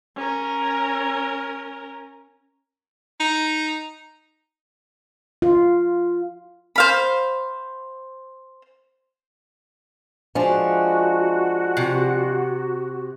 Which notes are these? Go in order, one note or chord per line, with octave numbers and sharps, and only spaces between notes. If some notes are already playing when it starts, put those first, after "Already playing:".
C#4 A#4
D#4
F4
C5 F5 B5
F3 G#3 D4 F#4
C3